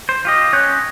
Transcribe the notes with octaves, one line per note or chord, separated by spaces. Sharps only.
C5
F4 G4 D#5
C#4 C#5 C#6 F#6 G6